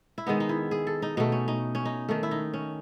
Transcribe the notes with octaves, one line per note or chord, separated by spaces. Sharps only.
E4
D#3 G#3 B3 D#4
D#4
E4
G#4
A4
D#4
B2 A3 D#4
C#4
D#4
C#4
D#4
D#3 A3
E4
D#4
C#4